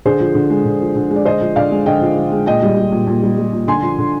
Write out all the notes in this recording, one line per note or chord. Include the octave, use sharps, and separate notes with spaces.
D3 G#4 C5
F3
D3
G#3
D3
F3
D3
G#3
D5
D3 C5 D#5
F3
D3 D5 F5
G#3
D3 D#5 G5
F3
D3
G#3
A#2 D#5 G5
G3
G3
A#2
A#2
G3
G3
A#2
D3 G#5 C6
F3
D3